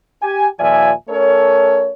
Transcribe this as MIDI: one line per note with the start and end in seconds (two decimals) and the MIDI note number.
0.22 0.47 67
0.22 0.47 80
0.60 0.91 39
0.60 0.91 46
0.60 0.91 53
0.60 0.91 74
0.60 0.91 76
0.60 0.91 80
1.09 1.92 57
1.09 1.92 61
1.09 1.92 69
1.09 1.92 70
1.09 1.92 73